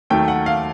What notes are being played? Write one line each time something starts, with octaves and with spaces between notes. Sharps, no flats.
D#2 D#3 F#3 A3 G5
F#5
F5